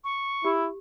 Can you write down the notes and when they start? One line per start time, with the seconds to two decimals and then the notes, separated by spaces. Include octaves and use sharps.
0.04 C#6
0.45 E4 G4